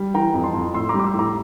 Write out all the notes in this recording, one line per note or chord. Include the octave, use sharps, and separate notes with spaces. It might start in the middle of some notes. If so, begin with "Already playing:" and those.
Already playing: G3
E3 G5 A#5
F2
A5 C6
F2
A2 C6 E6
A#5 D6
G3
D6
C6 E6
A2
A#5 D6